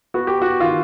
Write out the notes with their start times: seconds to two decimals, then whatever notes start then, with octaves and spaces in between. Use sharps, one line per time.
0.14 B3 F#4
0.27 G4
0.42 F#4
0.60 D#3 F4